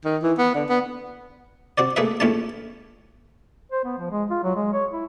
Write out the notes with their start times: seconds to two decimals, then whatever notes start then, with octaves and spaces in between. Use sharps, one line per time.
0.05 D#3
0.23 E3
0.38 B3
0.55 D3
0.69 B3
1.78 C4 F#4 C5 D5
1.96 A3 A#3 G#4 B4 E5
2.20 A#1 E2 A#2 A3 C#4 A5
3.72 C5
3.84 B3
3.98 F3
4.11 G#3
4.30 F4
4.43 F#3
4.56 G#3
4.73 C#5
4.92 E4